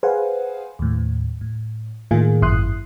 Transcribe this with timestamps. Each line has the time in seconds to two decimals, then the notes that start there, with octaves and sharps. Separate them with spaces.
0.03 G#4 B4 C5 F5 F#5 G#5
0.79 D#2 A2
1.41 A2
2.11 A2 D#3 A#3 F4 G#4
2.42 G#1 F#2 E4 C6 D#6 F#6